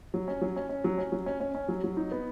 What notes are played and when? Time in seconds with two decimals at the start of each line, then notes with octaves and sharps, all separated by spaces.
0.14 F#3
0.28 C#4
0.42 F#3
0.56 C#4
0.69 C#4
0.84 F#3
0.98 C#4
1.12 F#3
1.26 C#4
1.40 C#4
1.55 C#4
1.68 F#3
1.84 F#3
1.97 D#4
2.12 B3